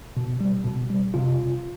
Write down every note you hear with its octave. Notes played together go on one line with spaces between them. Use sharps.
B2
G3
B2
G3
C3 F4